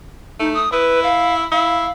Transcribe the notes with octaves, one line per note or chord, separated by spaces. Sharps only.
A3 D#4
D#6
E4 B4
F5
E4 F5